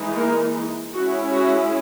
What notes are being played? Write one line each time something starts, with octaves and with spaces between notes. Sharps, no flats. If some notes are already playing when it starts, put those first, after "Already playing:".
Already playing: E3 G#3 D#4
A#3 A#4
G#3 C#4 E4 F#4
F#4